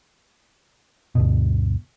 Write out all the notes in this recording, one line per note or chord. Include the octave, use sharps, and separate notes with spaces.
D2 G2 B2